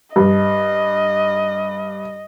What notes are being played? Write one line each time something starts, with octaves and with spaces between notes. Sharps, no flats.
G2 D#5